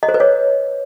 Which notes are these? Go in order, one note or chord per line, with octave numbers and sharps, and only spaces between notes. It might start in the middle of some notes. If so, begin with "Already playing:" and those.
D#5
C5
B4
C#5